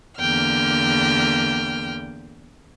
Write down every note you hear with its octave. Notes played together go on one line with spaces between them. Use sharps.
E2 D3 A#3 G5 F6